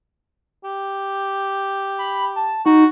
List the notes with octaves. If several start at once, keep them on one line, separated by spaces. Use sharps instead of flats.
G4
B5
A5
D#4 F#4